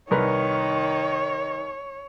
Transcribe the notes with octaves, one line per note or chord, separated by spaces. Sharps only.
C2 D#3 A#4 B4 C#5